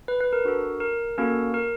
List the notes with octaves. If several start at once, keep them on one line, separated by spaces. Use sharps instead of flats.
B4
B4
A#4
D4 F#4 A4
A#4
A#3 C#4 F#4 A4 A#4
A#4